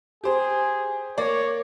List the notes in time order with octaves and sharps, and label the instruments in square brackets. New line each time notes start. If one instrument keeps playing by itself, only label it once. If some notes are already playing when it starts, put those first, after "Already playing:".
[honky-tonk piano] G4 C5 [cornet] G#4
[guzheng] A#3 [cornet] C#5 [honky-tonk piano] D5